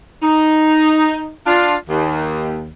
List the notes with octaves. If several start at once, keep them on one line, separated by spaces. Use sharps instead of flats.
D#4
D4 F4
D#2